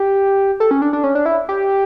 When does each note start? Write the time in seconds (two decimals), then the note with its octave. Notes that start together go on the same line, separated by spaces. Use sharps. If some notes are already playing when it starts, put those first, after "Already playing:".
Already playing: G4
0.60 A4
0.71 C#4
0.82 D4
0.93 D4
1.04 C#4
1.15 D4
1.26 E4
1.49 G4